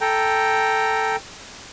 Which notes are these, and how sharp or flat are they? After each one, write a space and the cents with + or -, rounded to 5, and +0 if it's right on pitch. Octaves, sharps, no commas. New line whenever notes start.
A4 +0 G5 +0 A#5 +0